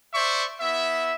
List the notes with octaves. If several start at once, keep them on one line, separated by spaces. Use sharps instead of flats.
C5 D5 E5 C#6
B3 E4 E5